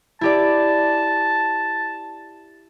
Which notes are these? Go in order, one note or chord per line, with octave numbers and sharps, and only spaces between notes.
E4 G4 D5 A5